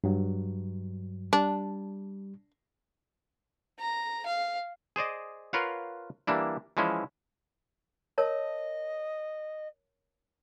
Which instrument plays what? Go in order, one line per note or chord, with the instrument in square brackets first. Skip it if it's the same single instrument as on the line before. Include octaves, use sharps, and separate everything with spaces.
[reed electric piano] G2 F#3
[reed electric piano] G3 [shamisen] D4
[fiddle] A#5
F5
[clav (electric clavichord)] G#4 C5 D5 D#5
F4 A#4 B4 C#5 F5 F#5
E3 G3 A#3 D4 E4
E3 F3 G#3 C#4 E4
[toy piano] A#4 C#5 A5 [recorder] D#5